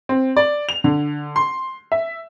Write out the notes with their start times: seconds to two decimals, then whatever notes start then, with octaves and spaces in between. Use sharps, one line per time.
0.09 C4
0.37 D5
0.69 F7
0.84 D3
1.36 C6
1.92 E5